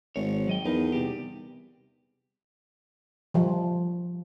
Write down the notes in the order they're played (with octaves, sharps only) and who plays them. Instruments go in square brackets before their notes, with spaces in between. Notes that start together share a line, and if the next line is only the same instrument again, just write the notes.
[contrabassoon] G#1 [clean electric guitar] C#5
[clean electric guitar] F#3 D#5 G5
[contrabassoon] E2 [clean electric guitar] D#4 A#4 B4
[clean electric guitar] C3 G3 G4
[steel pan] F3 G3